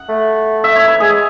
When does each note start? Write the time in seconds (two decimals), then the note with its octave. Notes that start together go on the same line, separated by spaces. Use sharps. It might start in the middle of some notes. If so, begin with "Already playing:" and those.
Already playing: F#5
0.09 A3
0.64 E5
0.76 C#5
0.88 B4
1.00 G#3 G#4